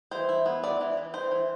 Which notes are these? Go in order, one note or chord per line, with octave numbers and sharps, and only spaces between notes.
E3 C5
E4
B3
E3 D5
E3
E3
E3 C5
E3